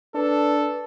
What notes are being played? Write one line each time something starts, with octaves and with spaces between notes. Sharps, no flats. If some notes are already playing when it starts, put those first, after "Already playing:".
D4 A4 B4